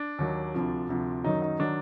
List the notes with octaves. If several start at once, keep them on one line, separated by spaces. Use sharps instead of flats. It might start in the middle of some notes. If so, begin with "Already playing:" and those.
Already playing: D4
D#2 D#3 F#3
D2 C3 F3
D2 C3 F3
F#2 D#3 F#3 D#4
D#4
D#3 F#3 D4